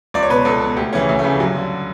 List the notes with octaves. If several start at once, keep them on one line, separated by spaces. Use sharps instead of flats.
C#2 D5
C#5
B2 B4
C#2 A4
B2
D2 G4
C#3 E3 C#4
D2
A3
C#3 E3
G3
G2 F#3
D3